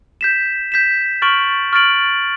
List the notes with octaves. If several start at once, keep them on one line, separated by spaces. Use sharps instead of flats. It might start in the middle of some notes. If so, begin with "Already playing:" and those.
G6 B6 E7
G6 B6 E7
C#6 F6 A6 D7 F#7
C#6 F6 A6 D7 F#7